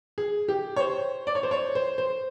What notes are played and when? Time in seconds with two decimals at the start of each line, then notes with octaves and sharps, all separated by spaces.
0.18 G#4
0.48 G4
0.76 C#5
0.80 C5
1.27 D5
1.35 C#5
1.43 C5
1.51 C#5
1.75 C5
1.98 C5